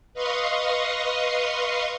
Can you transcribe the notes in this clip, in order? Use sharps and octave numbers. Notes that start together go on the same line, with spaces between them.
B4 D#5 F5 C6 C#6 D#6